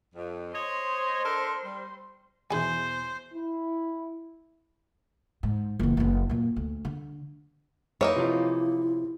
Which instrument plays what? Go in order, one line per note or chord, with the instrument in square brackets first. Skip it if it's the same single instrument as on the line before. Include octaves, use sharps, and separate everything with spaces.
[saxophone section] F2
[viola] C5 C6 [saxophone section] C#5 D#5
[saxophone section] D4 A4 A#4
G3
[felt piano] E2 B2 E3 [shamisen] G#4 G#5 [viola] C5
[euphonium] E4
[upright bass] G#2
F#1 E2
F#1 B3
F#2 A#2
D2
D3
[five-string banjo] E3 A#3 D#4 [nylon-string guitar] C#5
[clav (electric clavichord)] C3 F3 F4 [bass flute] E4